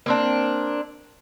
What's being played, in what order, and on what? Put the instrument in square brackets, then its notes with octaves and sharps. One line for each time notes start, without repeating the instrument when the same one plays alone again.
[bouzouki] A#3 C4 D4